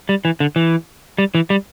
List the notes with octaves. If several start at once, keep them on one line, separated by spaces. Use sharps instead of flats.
G3
E3
D3
E3
G3
E3
G3